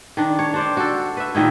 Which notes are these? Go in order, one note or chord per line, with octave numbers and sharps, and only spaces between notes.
D#3 D4
C#5
D4 C5 D5
F#4 A4
B4 E5
A#2 D#3 D#4 E4